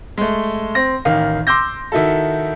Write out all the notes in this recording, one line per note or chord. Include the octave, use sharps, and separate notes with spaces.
G#3 A3
C4 A#6
A1 D#3 F5
C6 D6 E6 G6 A#6
D#3 E4 F#4 A4